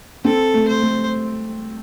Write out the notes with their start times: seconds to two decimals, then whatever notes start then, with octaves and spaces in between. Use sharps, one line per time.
0.25 C4 A4
0.54 A3
0.68 C5
0.82 A3